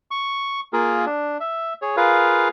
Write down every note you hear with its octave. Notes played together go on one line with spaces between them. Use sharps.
C#6
A#3 F4 G#4 A#4
D4
E5
G#4 C#5
F4 G#4 A#4 B4 F5